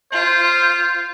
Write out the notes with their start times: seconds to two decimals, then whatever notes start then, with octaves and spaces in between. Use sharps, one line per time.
0.12 F4 C5